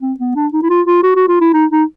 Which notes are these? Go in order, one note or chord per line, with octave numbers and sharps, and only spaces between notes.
C4
B3
D4
D#4
E4
F4
F4
F#4
F#4
F4
E4
D#4
D#4